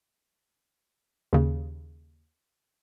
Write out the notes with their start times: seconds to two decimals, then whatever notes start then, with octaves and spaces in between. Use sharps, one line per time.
1.33 D#2 C#3